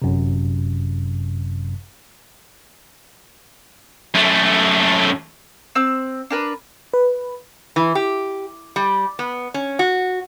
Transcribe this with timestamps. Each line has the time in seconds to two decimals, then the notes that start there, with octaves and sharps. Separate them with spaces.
0.02 G1 F#2 C3
4.15 F#2 A3
5.75 C4 E6
6.30 D4 A#4 B4
6.94 B4
7.76 E3
7.95 G4
8.76 G3
9.19 B3
9.54 C#4
9.79 F#4